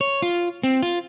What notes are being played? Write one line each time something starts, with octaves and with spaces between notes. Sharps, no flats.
C#5
F4
C4
F4